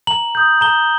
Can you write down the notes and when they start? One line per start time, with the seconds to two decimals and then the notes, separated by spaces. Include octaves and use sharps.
0.07 A#5 F#7
0.35 D#6 G6
0.61 A#5 G7